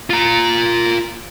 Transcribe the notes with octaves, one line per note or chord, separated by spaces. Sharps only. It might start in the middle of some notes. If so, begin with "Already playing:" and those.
F4 A#5